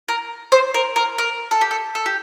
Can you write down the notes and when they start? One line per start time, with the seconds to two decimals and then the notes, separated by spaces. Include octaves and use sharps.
0.08 A#4
0.52 C5
0.74 A#4
0.96 A#4
1.18 A#4
1.51 A4
1.61 G4
1.71 A4
1.95 A4
2.06 G4